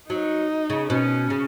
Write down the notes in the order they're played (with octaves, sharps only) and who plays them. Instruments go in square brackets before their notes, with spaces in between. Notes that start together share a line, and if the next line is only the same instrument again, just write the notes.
[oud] F#3 [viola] D#4
[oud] C#3
[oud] B2 [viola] C#4
[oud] C#3